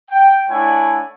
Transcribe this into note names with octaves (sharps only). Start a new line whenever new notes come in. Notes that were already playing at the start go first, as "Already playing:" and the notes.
G5
A3 D4 E4 C#5 F#5 G#5